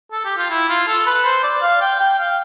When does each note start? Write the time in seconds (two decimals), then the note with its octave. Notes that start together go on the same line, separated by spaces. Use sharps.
0.12 A4
0.25 G4
0.38 F4
0.50 E4
0.69 F4
0.88 A4
1.06 B4
1.25 C5
1.43 D5
1.62 F5
1.81 G5
2.00 G5
2.19 F5